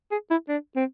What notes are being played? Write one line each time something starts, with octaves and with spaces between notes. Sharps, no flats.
G#4
E4
D4
C4